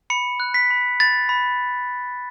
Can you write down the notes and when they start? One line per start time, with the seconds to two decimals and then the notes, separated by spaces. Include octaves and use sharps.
0.10 B5 C#7
0.40 F#6
0.54 B6
0.70 B5
1.00 B5 A6
1.29 B5